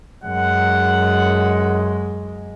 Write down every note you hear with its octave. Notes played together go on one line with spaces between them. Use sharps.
F#2 G#3 F#5